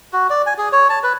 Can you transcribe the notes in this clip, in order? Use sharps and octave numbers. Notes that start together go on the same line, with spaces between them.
F#4
D5
G#5
G#4
C#5
A5
B4